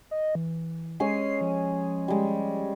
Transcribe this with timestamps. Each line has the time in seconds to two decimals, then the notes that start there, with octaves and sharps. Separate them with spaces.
0.11 D#5
0.35 E3
1.00 G#3 C#4 G#4 C7
1.41 F3
2.08 G3 G#3